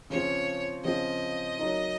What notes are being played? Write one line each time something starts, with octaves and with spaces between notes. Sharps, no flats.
C#3 F3 C4 C#5
C#3 F3 C4 D#5
F#3 A#3 D#4